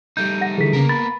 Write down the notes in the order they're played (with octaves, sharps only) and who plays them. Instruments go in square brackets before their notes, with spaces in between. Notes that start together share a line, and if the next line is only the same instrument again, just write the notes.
[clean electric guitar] G3 A3 D#4 [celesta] G6
[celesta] F#5 A#6
[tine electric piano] D3 E3 [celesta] G#4 B6
[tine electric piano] C#3 [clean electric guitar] A#3 B3 A#4
[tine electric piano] B5 [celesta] A6